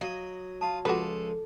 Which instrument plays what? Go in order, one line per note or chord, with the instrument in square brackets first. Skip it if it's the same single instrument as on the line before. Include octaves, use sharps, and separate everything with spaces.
[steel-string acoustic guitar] F#3 [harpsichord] D#5 D#6 [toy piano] F5
[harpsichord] F4 D#6 [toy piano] A5
[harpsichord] C#2 F3 D#6 [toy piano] F4 D6 [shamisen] F#4 B4 [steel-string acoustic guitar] A4